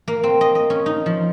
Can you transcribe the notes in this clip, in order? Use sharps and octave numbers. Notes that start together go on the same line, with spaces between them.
A#3
C4
D#5
D#5
C#4
D#4
F3